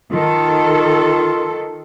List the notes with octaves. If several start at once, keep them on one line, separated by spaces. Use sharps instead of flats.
D#3 F4 A4